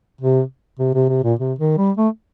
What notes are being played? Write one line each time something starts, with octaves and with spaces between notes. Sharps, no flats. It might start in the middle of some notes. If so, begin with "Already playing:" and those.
C3
C3
C3
C3
A#2
C3
D#3
G3
A3